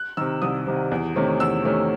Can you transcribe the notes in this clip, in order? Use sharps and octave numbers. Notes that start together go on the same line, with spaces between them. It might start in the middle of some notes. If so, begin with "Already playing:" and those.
Already playing: F#6
C3 D#3 E6
C2 D#6
C3 D#3
E2
C3 D#3 A3 C#4
E2 E6
C3 D#3 A3 C#4